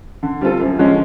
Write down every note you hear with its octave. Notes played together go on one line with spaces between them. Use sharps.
D3
G3 C4 F4 A4
F#2
D3 F3 G#3 C#4